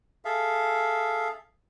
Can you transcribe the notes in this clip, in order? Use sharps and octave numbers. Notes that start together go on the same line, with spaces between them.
G#4 A4 E5 F5